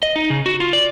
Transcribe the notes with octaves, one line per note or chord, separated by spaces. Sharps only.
D#5
D#4
C#3
F#4
F4
D5